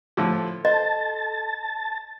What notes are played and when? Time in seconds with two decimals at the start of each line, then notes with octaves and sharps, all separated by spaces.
0.17 A2 D3 F3
0.65 A4 C5 D#5 A5